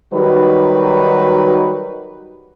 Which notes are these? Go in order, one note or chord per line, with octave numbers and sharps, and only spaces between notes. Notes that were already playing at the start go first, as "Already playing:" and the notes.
D#3 F#3 G3 D#4 F#4 B4